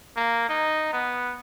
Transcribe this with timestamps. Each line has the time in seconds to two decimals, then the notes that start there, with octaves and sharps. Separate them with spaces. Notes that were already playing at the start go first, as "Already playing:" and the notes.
0.17 A#3
0.49 D#4
0.93 B3